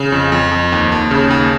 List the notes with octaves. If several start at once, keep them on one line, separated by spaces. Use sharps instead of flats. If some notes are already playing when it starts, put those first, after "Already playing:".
Already playing: C#3
F2
F2
F2
D#2
D#2
C#3
D#2